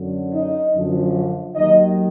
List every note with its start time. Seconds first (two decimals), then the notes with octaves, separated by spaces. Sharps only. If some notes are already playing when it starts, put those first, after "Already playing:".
Already playing: F#2 D3 F#3
0.32 D#4 D#5
0.72 F#2 D3 F3
1.55 D#2 D#3 F#3 D#4 D#5